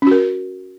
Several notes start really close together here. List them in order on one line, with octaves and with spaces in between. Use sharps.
C#4 F#4 A#4